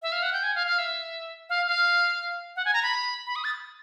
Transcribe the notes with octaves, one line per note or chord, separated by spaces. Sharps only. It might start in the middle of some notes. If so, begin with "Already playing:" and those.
E5
F5
F#5
G5
G#5
F5
F5
E5
F5
F5
F#5
G#5
A#5
B5
B5
D#6
A6